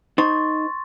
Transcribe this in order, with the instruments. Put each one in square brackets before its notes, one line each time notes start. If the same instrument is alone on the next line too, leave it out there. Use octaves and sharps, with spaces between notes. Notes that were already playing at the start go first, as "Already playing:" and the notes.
[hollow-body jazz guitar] D#4 C5 [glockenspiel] C6 C#6 A6